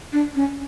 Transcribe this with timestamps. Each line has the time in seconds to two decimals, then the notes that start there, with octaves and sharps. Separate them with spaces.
0.13 D4
0.35 C#4